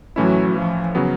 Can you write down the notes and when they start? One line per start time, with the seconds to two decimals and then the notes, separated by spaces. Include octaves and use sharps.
0.16 A2 E3 F#3 A3 C#4 E4
0.56 F3
0.95 C#3 F#3 B3